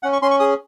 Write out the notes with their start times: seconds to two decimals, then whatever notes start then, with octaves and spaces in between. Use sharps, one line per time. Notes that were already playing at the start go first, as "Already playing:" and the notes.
0.03 C#4 F#5
0.13 C#6
0.22 C#4 C6
0.31 C#6
0.40 G#4 D#6